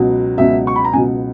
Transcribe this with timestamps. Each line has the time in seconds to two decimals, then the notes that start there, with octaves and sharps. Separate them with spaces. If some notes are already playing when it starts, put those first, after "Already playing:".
Already playing: C#2 B2 F#3
0.37 C#2 B2 F#3 E5
0.67 C#6
0.76 B5
0.85 A#5
0.93 C#2 B2 F#3 G#5